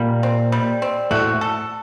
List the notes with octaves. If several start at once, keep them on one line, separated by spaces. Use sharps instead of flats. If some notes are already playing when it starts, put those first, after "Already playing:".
Already playing: A#2 G3 A#3
C4
G3
C4
A2 A3 F#4
A4